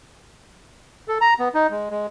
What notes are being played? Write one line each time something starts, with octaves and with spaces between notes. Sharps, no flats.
A4
A#5
B3
D#4
G#3
G#3